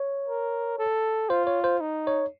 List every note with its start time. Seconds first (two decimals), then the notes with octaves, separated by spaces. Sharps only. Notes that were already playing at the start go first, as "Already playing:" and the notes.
Already playing: C#5
0.28 A#4
0.79 A4
1.30 F4 C5
1.47 C#5
1.64 C5
1.81 D#4
2.07 C#5